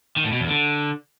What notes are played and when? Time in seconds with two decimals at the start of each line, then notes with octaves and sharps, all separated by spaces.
0.16 D#3
0.24 A2
0.32 B2
0.40 E2
0.48 D3